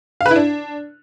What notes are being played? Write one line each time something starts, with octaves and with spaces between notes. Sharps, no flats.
F5
B4
E4
D4